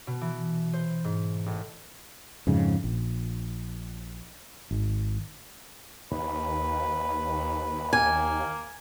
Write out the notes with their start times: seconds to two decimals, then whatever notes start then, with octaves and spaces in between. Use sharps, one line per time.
0.07 B2
0.21 E3
0.73 C5
1.04 G#2
1.46 A1
2.47 F2 G#2 C#3
2.84 A#1
4.71 G#1
6.11 D#2 B4
7.93 A#3 G#5